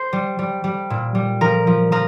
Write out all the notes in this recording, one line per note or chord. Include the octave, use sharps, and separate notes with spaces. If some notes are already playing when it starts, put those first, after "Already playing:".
Already playing: C5
G3
G3
G3
A#2
G3
F3 A#4
F3
F3 A#4